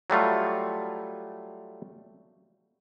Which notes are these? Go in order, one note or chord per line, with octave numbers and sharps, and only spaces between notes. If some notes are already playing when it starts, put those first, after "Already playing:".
F#3 G3 A3 F4